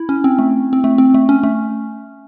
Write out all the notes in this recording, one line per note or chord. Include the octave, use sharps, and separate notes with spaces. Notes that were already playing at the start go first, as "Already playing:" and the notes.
Already playing: E4
C#4
C4
A3
C4
A3
C4
A3
C#4
A3